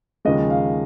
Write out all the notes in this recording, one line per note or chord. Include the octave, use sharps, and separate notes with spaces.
D#2 C#3 F3 G#3 D#5
F5